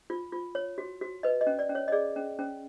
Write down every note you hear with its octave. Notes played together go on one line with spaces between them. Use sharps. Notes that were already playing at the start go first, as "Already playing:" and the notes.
F4
F4
C#5
F#4
F#4
B4 D#5
D#5
C#4
D5
C#4
C#5
D#5
G#4 D5
C#4
C#4